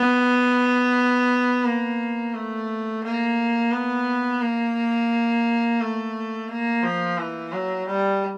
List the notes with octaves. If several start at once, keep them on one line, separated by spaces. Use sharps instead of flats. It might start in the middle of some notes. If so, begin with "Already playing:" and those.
Already playing: B3
A#3
A3
A#3
B3
A#3
A3
A#3
F3
E3
F#3
G3